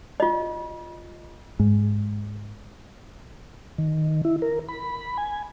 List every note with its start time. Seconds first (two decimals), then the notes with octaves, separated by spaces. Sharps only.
0.20 F4 D#5
1.60 G#2
3.78 D#3
4.25 E4
4.42 A#4
4.69 B5
5.17 G#5